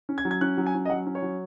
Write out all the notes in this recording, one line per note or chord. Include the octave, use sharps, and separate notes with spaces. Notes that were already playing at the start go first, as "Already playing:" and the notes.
C#4
G#6
F#3
G#6
C#4 F#6
F#3
G#5
C#4
D#5
F#3 F#5
C#4
C#5
F#3